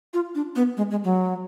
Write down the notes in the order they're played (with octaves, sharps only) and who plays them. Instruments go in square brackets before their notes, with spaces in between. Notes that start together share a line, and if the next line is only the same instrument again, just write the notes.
[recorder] F4
D4
B3
G#3
G#3
F#3